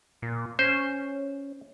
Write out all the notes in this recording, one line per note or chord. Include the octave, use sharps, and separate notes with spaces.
A#2
C#4 C5